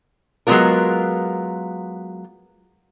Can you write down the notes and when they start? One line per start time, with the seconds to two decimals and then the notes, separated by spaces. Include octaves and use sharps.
0.47 F#3 G#3 A3 B3 F4 A#4